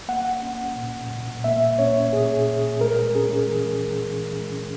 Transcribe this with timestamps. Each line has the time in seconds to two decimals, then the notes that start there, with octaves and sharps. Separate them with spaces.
0.08 A#3 F#5
0.42 C#4
0.76 A#2
1.10 A#2
1.44 A#3 E5
1.78 C#4 C#5
2.13 A#2 G#4
2.48 A#2
2.81 G#3 A#4
3.15 C#4 G#4
3.49 E3
3.84 E3
4.19 G#3
4.52 C#4